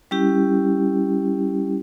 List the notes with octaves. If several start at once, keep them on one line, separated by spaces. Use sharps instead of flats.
G3 C#4 E4 G4